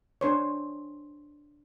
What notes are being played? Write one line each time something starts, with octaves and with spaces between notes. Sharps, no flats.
D4 C5 C#5